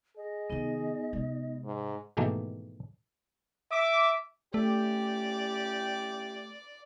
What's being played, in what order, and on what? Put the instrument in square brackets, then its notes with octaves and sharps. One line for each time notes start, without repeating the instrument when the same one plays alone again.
[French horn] G#4 [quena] D#5
[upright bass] C3 D#3 [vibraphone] B3 D#4
[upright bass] C3 G#3
[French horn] G#2
[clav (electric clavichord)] G#2 B2 D#3 E3 A3 A#3
[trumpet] E5 [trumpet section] D6
[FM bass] A3 [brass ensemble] C#4 E4 G4 [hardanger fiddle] D5